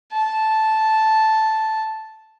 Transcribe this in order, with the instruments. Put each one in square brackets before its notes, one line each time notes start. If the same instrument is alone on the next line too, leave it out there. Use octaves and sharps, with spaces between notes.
[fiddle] A5